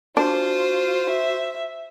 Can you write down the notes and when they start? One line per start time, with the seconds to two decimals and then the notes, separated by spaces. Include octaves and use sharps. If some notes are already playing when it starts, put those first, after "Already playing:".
0.17 D4 F4 F#4 C5
1.10 E5